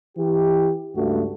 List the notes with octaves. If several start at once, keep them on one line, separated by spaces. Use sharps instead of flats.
E3 G4
C#2 G2 A3 F#4